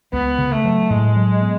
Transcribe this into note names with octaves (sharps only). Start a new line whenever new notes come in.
C#2 B3
C#3
A3
F#3
A2 G#3
F#3
B3